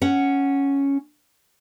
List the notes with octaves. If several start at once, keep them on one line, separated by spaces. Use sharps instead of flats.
C#4 F#5